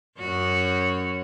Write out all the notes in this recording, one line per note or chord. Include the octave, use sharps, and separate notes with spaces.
F#2 F#4 C#5